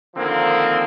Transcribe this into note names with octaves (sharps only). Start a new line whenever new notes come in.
D3 D#3 F3 A#3 C4